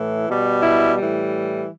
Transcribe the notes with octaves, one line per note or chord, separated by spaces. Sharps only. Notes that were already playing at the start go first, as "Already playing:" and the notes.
Already playing: A2 E3
B2 G3
E4
A2 E3 G3